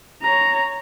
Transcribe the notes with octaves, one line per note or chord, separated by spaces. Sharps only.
C#5 A#5